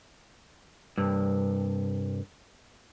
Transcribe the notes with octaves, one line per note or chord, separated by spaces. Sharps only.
C2 G2